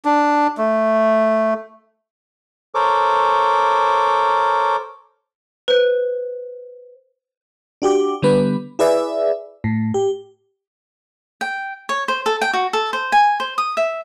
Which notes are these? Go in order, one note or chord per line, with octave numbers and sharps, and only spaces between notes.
D4
A3
A4 A#4 C5 C#5 D6
B4 C5
D4 F#4 G4 D6
D3 G3 B3 B4
E4 G#4 B4 D5 E5
A2
G4
G5
C#5
C5
A4
G5
F#4
A4
C5
G#5
C5
D#6
E5